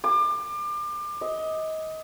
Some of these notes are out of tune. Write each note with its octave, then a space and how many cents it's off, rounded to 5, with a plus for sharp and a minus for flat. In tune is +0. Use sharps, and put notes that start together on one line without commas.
D6 +30
D#5 +25